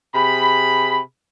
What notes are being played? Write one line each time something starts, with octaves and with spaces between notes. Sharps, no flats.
C3 G#4 B5